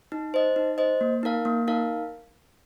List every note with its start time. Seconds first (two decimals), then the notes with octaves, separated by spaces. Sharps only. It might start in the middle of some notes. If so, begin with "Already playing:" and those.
0.12 D#4
0.34 C5 D#5
0.56 D#4
0.78 C5 D#5
1.01 A#3
1.23 D#4 A#4 F5
1.45 A#3
1.67 D#4 A#4 F5